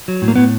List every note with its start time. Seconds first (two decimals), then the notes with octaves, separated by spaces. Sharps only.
0.08 F#3
0.22 A2
0.28 A#3
0.36 A2 B3